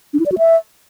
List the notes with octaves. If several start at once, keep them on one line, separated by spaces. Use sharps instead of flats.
D4
E4
D5
F#4
E5